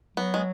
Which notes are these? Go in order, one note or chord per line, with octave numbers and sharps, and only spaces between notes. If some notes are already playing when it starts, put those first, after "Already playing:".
F#3 B3
G#3